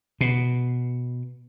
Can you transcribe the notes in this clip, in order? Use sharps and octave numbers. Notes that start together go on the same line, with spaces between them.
B2